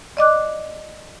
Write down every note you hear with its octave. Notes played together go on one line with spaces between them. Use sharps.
D5 D#5 D6 F#6